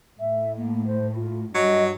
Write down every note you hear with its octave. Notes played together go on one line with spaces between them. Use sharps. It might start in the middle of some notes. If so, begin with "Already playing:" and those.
A2 E5
A#3
C5
F4
G2 F#3 D#5